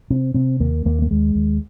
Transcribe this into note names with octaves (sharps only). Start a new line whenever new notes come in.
C3 C4
C3 C4
D#2 A#3
D#2 A#3
A#3
D#2 G#3
D#2